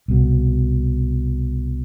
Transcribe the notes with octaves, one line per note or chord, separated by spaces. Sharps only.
C2 B2